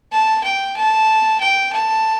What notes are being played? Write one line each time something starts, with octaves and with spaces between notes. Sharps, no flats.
A5
G5
A5
G5
A5